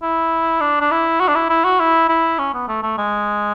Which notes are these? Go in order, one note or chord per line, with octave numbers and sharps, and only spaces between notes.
E4
D4
D4
E4
F#4
D4
E4
E4
F#4
E4
E4
C#4
B3
A3
A3
G#3